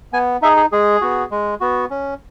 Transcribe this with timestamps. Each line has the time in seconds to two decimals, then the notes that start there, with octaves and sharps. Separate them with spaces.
0.13 B3 G#5
0.42 D#4 G#4 E5
0.57 G#4
0.72 G#3 G#4
1.01 B3 F#4
1.31 G#3
1.61 B3 F#4
1.90 C#4